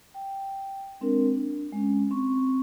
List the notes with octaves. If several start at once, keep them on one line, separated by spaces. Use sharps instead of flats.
G5
G#3 C4 D4 A#4
D4
G#3 C#4
C4 C#6